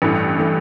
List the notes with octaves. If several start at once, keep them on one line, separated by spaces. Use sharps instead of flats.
A1 G2 E3 A3
E3 A3